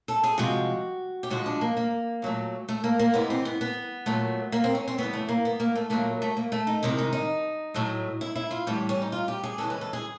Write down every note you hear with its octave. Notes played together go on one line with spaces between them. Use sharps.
A4
G#4
C3 F3 G#3 F#4
G4
D3 F3 G#3 F#4
D4
A#3
A#3
A#2 F#3 A3
A3
A#3
A#3
C3 E3 G#3 B3
C4
B3
B3
A#2 F#3 A3
A#3
C4
C#4
C4
C#3 E3 G3 B3
A3
A#3
B3
A#3
A3
A#2 F#3 A3 A#3
A3
A#3
A3
D#4
C3 D#3 G#3 E4
D#4
D#4
A2 F#3 A3
E4
E4
F4
A2 E3 G3 E4
C#4
D#4
F4
G4
G#4
C#3 E3 G#3 A4
B4
A4
G#4